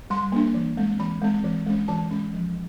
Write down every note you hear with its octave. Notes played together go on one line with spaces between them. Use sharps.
G3 C6
A#3 D4
E3
G#3 C4
E3 B5
G#3 C4
E3
G#3 C#4
E3 A5
G#3 C#4
F3